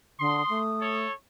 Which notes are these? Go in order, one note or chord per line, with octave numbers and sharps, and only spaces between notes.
D3 C6 D#6
A3
A4 C#5